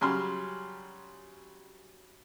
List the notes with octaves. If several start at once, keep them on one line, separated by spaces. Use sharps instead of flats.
C#3 F#3 G3 G#5 C6 F6